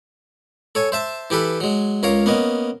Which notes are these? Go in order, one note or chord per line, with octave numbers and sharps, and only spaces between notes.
A4 C#5 G#5
C5 E5 A5
E3 G4 A4 B4
F#3 G#3
C#2 A#4 C#5 F5
A#3 B3 C#4 D#5